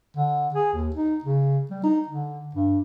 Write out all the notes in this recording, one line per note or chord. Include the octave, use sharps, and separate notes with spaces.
D3
G#4
D#2
D#4
C#3
G3
D#4
D3
G2